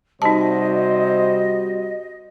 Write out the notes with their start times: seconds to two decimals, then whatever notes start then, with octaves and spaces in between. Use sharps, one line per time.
0.22 C3 G3 D#4 F#4 C5 D#5 A5